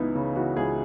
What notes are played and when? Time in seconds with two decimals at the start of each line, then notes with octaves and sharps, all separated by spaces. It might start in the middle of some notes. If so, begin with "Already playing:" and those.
Already playing: C#2 E3 B3 D#4 E4
0.15 C#3
0.35 E3 F#4
0.57 C#2 G#4